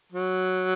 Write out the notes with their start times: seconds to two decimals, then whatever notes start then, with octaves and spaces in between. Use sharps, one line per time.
0.12 F#3